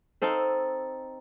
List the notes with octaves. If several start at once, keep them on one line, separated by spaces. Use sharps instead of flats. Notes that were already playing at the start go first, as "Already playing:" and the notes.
C4 D#4 A4 F5